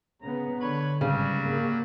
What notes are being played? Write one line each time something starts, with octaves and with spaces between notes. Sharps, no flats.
C#3 B3 A#5
D3 B4 C#5 B5
G#1 G2 C#3 F#3 G3 C#4
A#3